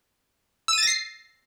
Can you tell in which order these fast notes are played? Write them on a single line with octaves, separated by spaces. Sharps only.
E6 D#7 A6 A#6 C7